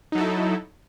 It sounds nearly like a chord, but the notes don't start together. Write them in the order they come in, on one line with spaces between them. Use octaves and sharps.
D#4 F#3 A4 E4